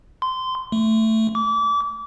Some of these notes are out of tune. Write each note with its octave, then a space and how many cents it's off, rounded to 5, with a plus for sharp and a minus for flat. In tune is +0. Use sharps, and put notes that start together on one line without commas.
C6 -20
A3 +10
D6 -30